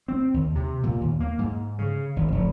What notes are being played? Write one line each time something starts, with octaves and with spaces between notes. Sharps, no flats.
C4
D#2
C3
A#2
D#2
A#3
G#2
C#3
G#1
F1